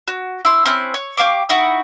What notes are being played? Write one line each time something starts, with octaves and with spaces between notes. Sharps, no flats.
F#4
E4 C6
C4 C#4 E4 F#6
C#5
G4 F5 C#6 D6
D#4 E4 F#4